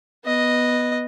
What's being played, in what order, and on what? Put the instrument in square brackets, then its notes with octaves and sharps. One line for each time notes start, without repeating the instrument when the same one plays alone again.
[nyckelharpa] B3 D#5